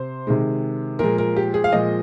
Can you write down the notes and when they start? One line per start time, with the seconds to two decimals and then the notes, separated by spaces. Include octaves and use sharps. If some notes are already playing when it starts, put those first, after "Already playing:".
Already playing: C3 C5
0.27 C3 D#3 G#3
0.99 A#2 F3 G#3 A#4
1.18 A#4
1.37 G4
1.54 G#4
1.64 F5
1.73 A#2 F3 G#3 D#5